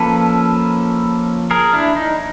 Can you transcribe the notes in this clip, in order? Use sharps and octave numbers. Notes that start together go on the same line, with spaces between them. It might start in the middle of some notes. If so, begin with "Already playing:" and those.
Already playing: F3 A#3 C#4 A4 B4
G#4 A#4
D4 E4
D#4